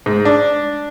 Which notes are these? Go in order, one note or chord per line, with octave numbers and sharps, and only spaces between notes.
G#2
D4